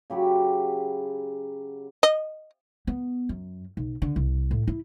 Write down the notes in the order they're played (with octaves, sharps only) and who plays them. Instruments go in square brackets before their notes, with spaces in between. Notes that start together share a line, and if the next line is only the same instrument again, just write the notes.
[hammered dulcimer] C#3 F#3 G4 B5
[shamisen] D#5
[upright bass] B3
F#2
B1
D3
C2
A2
E4